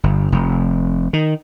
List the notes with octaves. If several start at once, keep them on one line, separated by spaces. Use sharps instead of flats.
G1
F1
D#3